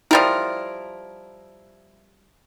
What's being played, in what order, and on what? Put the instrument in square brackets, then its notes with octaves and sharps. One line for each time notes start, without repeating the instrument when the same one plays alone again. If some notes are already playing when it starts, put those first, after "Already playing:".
[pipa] F3 G3 A#4 [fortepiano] E4